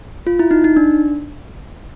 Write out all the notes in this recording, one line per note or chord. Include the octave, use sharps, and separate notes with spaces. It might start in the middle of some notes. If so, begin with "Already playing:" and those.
F4
E4
D#4
D#4
D4